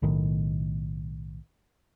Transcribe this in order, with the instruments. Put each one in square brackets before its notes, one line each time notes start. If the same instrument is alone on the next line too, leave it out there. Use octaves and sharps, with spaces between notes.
[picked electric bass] B1 A2 D#3